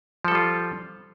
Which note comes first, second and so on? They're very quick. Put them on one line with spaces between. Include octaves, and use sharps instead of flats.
F3 A4 G3 F4